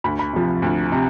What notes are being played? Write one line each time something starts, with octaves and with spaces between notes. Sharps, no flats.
D2 B5
B5
C3 F3
D2
C3